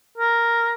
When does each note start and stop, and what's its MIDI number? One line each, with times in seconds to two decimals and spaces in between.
0.18 0.74 70